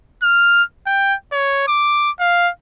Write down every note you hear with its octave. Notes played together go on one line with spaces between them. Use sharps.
F6
G5
C#5
D6
F5